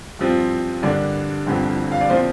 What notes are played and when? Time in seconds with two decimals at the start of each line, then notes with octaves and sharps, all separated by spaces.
0.19 G2 F3 C4 F4
0.82 G2 D3 A#3 D4 D5
1.47 G1 G2 D3 F3 C4
1.92 F5
2.01 D5
2.09 A#2 F3 C4 C5